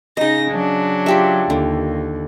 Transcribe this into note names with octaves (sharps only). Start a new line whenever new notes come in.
C#3 D#4 D#5 A#6
F#3 D4
F4 G4 E5
D#2 D3